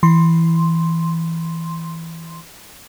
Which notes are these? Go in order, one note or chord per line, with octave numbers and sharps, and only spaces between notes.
E3 C6